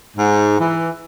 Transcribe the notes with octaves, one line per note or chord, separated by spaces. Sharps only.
G#2
E3